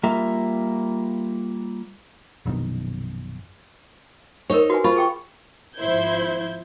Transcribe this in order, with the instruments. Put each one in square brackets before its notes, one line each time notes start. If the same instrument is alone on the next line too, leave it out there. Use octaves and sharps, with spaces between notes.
[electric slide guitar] G3 A#3 F4 E5 A#5
[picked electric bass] A#1 F#2 B2 D#3
[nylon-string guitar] D#4 C#5 [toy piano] A#4 C5
[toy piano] F#4 B4 G#5
[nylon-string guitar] F4 [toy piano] C5 B5 C#6
[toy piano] G#4 G5 C#6
[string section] G#1 F3 E4 C5 G6 G#6